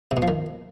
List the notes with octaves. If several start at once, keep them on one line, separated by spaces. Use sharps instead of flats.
C3
B2
F3
D#3